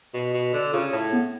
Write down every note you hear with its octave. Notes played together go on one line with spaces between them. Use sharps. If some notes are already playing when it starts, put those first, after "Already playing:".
B2
B2
D3
C#3 F4
A2
B3